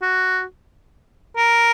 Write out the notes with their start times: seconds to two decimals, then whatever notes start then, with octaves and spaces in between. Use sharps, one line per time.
0.02 F#4
1.37 A#4